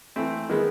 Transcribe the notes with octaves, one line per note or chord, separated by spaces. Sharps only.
E3 A3 C4
D#3 G#3 B3